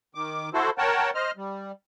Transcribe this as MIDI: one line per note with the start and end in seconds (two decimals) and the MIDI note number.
0.15 0.49 51
0.15 0.49 86
0.54 0.70 64
0.54 0.70 66
0.54 0.70 69
0.54 0.70 72
0.78 1.10 70
0.78 1.10 73
0.78 1.10 78
0.78 1.10 79
0.78 1.10 81
1.15 1.31 72
1.15 1.31 75
1.15 1.31 89
1.37 1.72 55